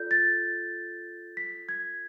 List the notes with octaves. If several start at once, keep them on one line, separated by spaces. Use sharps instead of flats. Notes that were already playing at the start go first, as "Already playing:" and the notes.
Already playing: F4 A4 D5 G6
A6
B6
G#6